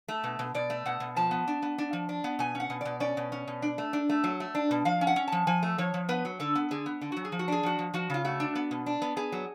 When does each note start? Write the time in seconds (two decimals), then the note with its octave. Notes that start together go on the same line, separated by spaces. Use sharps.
0.08 A3
0.24 B2
0.39 B2
0.54 B2 D5
0.70 A3
0.86 B2 F#5
1.00 B2
1.16 F3 A5
1.31 B3
1.48 D4
1.62 B3
1.78 D4
1.93 F3
2.09 D4
2.24 B3
2.39 B2 G#5
2.55 C#4
2.60 F#5
2.70 B2
2.81 B2 D5
3.00 C#4 D5
3.17 B2
3.32 C#4
3.48 B2
3.62 D4
3.78 A3
3.93 D4
4.09 A3
4.24 F#3
4.40 A3
4.55 D4
4.71 B2
4.85 F3 F5
5.01 C#4
5.07 F#5
5.16 C#4
5.28 F3 A5
5.47 F3 G#5
5.63 A3
5.78 F3 C#5
5.94 F3
6.09 B3 B4
6.25 F#3
6.40 D3 A4
6.55 B3
6.71 D3 G#4
6.86 B3
7.01 D3
7.12 F#3 F#4
7.25 G#4
7.32 F3
7.39 F#4
7.48 D4 G#4
7.63 F3 F#4
7.79 F3
7.94 F3 F#4
8.10 C#3 F4
8.25 A3 F#4
8.40 D4
8.55 B3
8.71 B2
8.86 D4
9.02 B3
9.17 B3 G#4
9.32 F#3